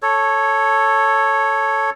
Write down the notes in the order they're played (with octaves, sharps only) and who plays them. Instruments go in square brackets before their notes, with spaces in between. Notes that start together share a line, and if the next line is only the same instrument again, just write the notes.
[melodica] A4 C#5